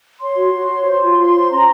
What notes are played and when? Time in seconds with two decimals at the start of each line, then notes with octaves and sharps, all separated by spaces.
0.20 C#5 C6
0.37 F#4
0.53 F#4
0.69 C#5
0.85 C5
1.02 F4
1.18 F4 C6
1.34 C5
1.51 C#4 A#5